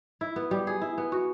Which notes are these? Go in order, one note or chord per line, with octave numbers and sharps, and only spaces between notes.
E4
B3
G3
G#4
E4
B3
F#4